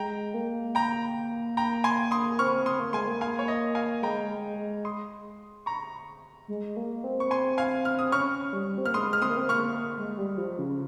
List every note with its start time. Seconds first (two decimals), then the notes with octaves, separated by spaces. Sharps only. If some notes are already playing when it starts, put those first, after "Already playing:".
Already playing: G#3 G5 A#5
0.34 A#3
0.75 G5 A#5
1.57 G5 A#5
1.84 G#5 C6
2.11 C6 D#6
2.39 C4 C#6 F6
2.66 C6 D#6
2.79 A#3
2.93 G#3 G#5 C6
3.08 A#3
3.21 F5 G#5
3.39 C#5
3.48 D#5
3.75 F5 G#5
4.03 G#3 G5 A#5
4.30 G#3
4.58 G#3
4.85 C6 D#6
5.66 A#5 C#6
6.48 G#3
6.77 A#3
7.04 C4
7.20 C#6
7.31 G#5 C6
7.58 F5 G#5
7.85 F6
7.99 D#6
8.12 C#4 C#6 F6
8.53 G3
8.78 C4
8.85 A#3 F6
8.94 G#3 C6 D#6
9.13 F6
9.22 C4 C6 D#6
9.30 A#3
9.37 C4
9.49 A#3 C#6 F6
9.98 G#3
10.18 G3
10.38 F3
10.59 C#3